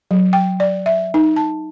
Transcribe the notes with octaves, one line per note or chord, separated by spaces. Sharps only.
F#3
G5
D5
E5
D#4
A5